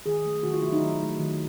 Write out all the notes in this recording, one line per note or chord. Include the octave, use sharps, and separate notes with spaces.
D#3 G#4
F#3 A3
D#3 F#4
F4
F#3 A3 E4
D#4
D#3
F#3 A3
D#3